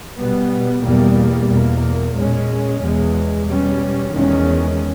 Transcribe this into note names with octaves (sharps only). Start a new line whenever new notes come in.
B2 G3 B3
E2 B2 G3 A#3
E2 B2 A#3
A#2 G#3 C#4
E2 B2 G#3
B2 G3 C#4
E2 D#3 G#3 C#4